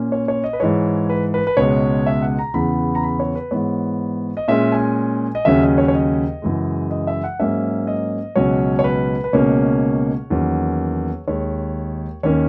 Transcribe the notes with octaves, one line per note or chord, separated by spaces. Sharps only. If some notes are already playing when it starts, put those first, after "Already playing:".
Already playing: A#2 A#3 C#4
C#5
C#5
D#5
B4
G#2 E3 G#3 C#5
B4
B4
B4
C#2 B2 G#3 C#5
E5
F#5
A#5
E2 C#3 E3 B3 B5
A#5
B5
C#5
B4
G#2 E3 B3 C#5
D#5
A#2 G#3 C#4 E5
G#5
D#5
D#2 C#3 F#3 C#4 E5
D#5
C#5
C#5
D#5
F#2 C#3 E3 G#3
D#5
E5
F#5
G#2 F#3 A#3 C#4 E5
D#5
C#2 B2 F#3 C#4 C#5
C#5
B4
B4
C#2 B2 A#3 C#4 C#5
E2 D#3 F#3 A#3 C#4
D#2 D#3 G#3 C#5
D#2 D#3 A#3 C#4 C#5